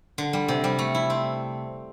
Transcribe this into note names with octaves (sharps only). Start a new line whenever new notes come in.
D3
G3
C3
G3
A3
E4
C4